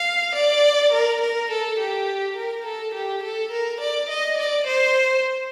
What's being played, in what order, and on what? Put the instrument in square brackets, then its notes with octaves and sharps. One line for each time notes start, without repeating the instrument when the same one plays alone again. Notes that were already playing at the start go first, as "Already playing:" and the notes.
Already playing: [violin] F5
D5
A#4
A#4
A4
G4
A#4
A4
G4
A4
A#4
D5
D#5
D5
C5